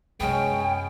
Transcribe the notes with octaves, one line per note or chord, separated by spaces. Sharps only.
F#2 C3 G#3 B3 C#4 G5